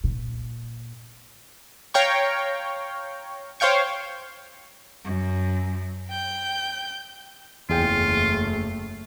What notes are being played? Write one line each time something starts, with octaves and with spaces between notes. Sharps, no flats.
A#2
C#5 F5 G5 A#5 C#6
C5 C#5 F5 G5 C#6
F#2
G5 G6
F#1 E2 A3 F4 G#4 G5